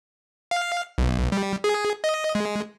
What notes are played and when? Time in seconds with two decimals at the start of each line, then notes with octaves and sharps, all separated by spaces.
0.51 F5
0.98 B1
1.32 G3
1.64 G#4
2.04 D#5
2.35 G#3